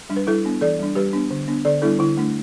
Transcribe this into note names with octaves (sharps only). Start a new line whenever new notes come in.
G3 D4
B4
G3 E4 A4
B3 D4
E3 A4 D5
G3 D4
G3 G4 B4
B3 D4
D3
B3 D4
D3 A4 D5
G3 B3 D4 E4 A4
D3 E4
A3 D4